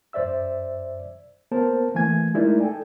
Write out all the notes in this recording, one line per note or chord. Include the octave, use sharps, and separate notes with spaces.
F#2 C5 D5 E5 E6
A#3 B3 A#4 C5 A5
E3 A3 A#3 G#5 G#6
G#3 A3 D#4 E4 A#4 D5
A4 G5 G#5